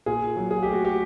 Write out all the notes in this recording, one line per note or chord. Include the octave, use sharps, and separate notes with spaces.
A#2 G#4
F#3
G#4
A3 G4
F#4
G4